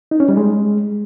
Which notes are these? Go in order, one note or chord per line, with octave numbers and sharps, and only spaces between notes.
D#4
C#4
G3
G#3